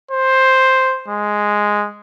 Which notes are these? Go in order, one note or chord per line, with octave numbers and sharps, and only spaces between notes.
C5
G#3